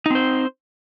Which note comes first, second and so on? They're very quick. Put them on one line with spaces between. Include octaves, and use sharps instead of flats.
D#4 C4 C5